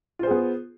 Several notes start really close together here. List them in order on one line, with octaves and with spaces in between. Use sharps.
F4 C5 G#4 B3